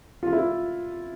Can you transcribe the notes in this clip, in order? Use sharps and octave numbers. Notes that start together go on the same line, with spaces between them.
F4
E4